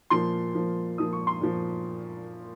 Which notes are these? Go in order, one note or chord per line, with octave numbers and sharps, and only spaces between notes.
A#2 F3 C6
A#2 F3
A#2 F3 D#6
C#6
C6
A#2 F3